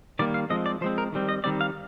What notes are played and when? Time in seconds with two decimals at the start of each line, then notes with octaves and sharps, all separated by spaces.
0.19 D#3 G3 A#3 D5
0.34 F5
0.50 F3 G#3 C4 D#5
0.66 D5
0.81 F3 G#3 C4 C5
0.98 A#4
1.12 D#3 G3 C4
1.29 D#5
1.44 D#3 G3 C4 D5
1.61 F5